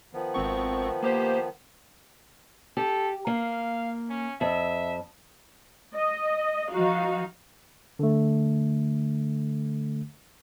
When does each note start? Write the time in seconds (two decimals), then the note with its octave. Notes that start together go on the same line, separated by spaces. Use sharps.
0.13 D#3 F3 B3
0.34 G#1 C4 C#6
1.03 A#3 G4 C5
2.77 G4 A4
3.27 A#3 F5
4.10 C#4
4.41 F2 E5
5.95 D#5
6.71 F3 D#4 F#4 F5
7.99 D3 A3